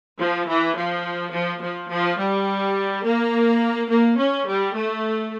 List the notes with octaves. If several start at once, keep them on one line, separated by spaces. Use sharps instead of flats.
F3
E3
F3
F3
F3
F3
G3
A#3
A#3
C#4
G3
A3